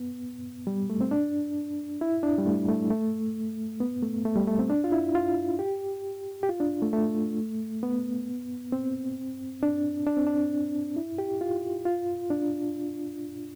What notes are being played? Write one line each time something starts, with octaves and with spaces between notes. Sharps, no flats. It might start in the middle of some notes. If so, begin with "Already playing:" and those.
Already playing: B3
G3
A3
C4
D4
E4
D4
G3
A3
A3
A3
B3
A3
A3
G3
A3
C4
D4
F4
E4
F4
G4
G4
F4
D4
A3
A3
B3
C4
D4
D4
C4
D4
E4
G4
F4
F4
D4